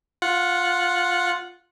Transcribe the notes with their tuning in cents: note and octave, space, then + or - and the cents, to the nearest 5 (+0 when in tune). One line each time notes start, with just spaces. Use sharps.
F4 +10 F#5 -10